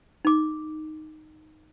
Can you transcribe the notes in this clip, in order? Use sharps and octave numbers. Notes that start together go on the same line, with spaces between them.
D#4 D6